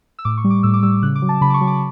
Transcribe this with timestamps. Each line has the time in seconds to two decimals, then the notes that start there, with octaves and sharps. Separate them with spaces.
0.19 E6
0.25 A2 D6
0.38 C#6
0.44 G3
0.50 D6
0.63 A2 E6
0.74 D6
0.83 G3 E6
1.03 C#3 F#6
1.15 D6
1.22 F#3
1.29 A5
1.41 C#3 B5
1.50 D6
1.54 C#6
1.61 F#3
1.67 D6